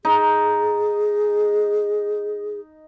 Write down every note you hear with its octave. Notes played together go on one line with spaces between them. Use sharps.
D#4 G#4